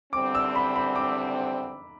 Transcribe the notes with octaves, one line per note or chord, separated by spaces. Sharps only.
E2 D3 G3 C4 D6
E6
B5
B5
D6